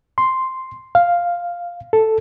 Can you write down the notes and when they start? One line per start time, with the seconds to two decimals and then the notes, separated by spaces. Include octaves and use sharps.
0.18 C6
0.95 F5
1.93 A4